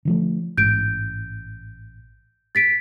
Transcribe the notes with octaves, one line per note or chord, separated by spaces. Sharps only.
D3 F3 A3
A1 G#2 G6 D7
A6 B6 D7